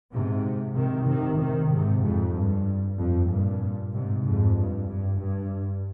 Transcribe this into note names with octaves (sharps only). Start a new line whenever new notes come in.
G#2 C3
C3 D#3
C3 D#3
C3 D#3
G#2 C3
F2 G#2
G2
F2
G2 A#2
G#2 C3
F2 G#2
G2
G2
G2